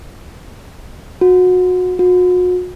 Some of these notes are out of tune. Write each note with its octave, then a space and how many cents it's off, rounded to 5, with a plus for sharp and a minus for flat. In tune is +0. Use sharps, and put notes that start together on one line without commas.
F#4 -25
F#4 -40